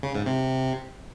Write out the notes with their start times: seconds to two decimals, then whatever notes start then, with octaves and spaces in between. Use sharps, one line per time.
0.03 C#3
0.15 G#2
0.26 C3